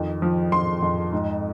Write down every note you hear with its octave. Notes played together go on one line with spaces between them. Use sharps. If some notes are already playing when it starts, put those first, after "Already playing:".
Already playing: F2 D#3
F3
F3 C6
F2
G#2